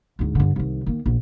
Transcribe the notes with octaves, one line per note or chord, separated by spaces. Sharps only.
D2 G#2
G2 D3
C2 D#3
D#3 A#3
A#1